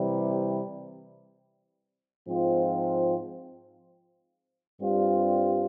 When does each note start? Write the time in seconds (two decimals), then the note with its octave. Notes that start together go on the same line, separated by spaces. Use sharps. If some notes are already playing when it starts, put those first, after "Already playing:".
Already playing: C3 E3 G3
2.27 G#2 F3 C4 F4
4.81 G2 G3 C4 F4